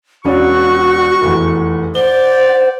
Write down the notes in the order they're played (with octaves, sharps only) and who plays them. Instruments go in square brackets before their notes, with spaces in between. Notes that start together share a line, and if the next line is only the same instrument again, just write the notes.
[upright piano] E1 C#4 D5 [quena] F#4 [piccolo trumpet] C#6
[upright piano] F1 E2
[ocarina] C5 [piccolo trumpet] D5 [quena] F#5 [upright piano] G7